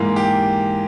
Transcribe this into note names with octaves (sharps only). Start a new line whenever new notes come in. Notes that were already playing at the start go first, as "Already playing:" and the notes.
Already playing: G#2 E3 A#3
G4